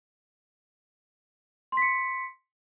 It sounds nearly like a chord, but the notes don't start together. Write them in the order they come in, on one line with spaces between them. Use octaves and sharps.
C6 B6 C#7